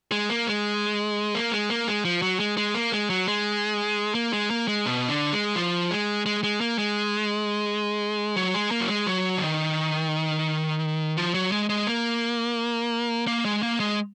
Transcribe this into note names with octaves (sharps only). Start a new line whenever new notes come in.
G#3
A#3
G#3
A#3
G#3
A#3
G#3
F3
F#3
G#3
G#3
A#3
G#3
F#3
G#3
A#3
G#3
A#3
G#3
B2
D3
G#3
F3
G#3
G#3
G#3
A#3
G#3
F#3
G#3
A#3
F#3
G#3
F#3
D3
D#3
F3
F#3
G#3
G#3
A#3
A#3
G#3
A#3
G#3